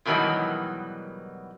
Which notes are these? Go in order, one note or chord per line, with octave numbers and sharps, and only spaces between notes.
G#2 B2 D#3 E3 F#3 G3